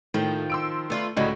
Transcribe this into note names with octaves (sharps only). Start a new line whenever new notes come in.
A2 D#3 F3 G5
C6 E6 D7
A3 B3 F4 B4 D5
C#2 A2 D3 F#3 D#4 F#4 B5